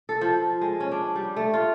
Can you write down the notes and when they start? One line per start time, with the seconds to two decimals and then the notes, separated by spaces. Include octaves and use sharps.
0.09 A4
0.21 F3
0.61 G#3
0.80 C#4
0.92 D4
1.15 G3
1.36 A3
1.54 F4